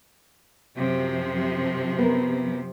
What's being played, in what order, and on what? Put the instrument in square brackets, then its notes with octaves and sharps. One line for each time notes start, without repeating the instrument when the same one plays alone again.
[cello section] F#2 C3 F3
[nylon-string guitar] B3 A#4